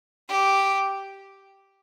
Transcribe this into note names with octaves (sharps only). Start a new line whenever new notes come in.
G4